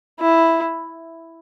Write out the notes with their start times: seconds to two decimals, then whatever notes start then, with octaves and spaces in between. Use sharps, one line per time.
0.20 E4